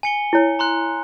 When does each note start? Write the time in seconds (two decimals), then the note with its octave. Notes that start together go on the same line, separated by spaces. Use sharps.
0.03 G#5 C#7 G7
0.33 E4 C#5
0.59 A#5 C6 F#6